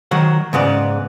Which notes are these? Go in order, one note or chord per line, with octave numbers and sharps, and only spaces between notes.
D#3 F#3 F#5
G#2 C#3 B3 D5